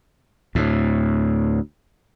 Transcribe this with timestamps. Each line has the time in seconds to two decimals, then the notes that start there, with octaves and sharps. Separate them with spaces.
0.55 D2 A2